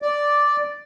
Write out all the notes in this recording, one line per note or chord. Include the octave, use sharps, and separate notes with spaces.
D5